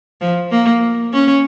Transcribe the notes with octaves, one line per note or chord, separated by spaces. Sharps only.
F3
A#3
C#4